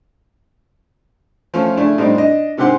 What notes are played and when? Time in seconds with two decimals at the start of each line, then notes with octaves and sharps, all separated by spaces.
1.54 F3 A3 C#4
1.77 C#3 A3 D4 E4
1.98 A2 G3 C4 D4 D#4
2.15 D4 D#5
2.57 G#2 C3 G4 C5 F#5 C6